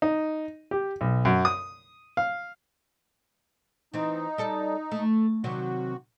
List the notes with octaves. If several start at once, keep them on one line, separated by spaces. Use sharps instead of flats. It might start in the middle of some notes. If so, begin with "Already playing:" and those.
D#4
G4
B1
F#2
D#6
F5
E3 C4 D#4
G3 A4
A3
C3 D#3 F#3 F#4